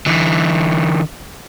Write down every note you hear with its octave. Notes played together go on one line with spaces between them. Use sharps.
D3 E3